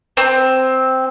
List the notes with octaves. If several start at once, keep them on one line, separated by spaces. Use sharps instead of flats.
C4